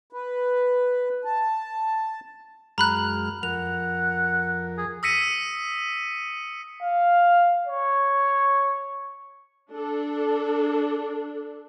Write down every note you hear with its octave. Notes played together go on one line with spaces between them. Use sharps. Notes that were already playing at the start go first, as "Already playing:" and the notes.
B4
A5
F#2 G#3 A#5 B5 F6 F#6
F2 A#4 F#5 F7
G#4
D#6 E6 A#6 B6 C#7 D#7
F5
C#5
D4 A4